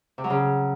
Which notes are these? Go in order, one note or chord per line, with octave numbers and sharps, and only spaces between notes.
C3
F#3
C#3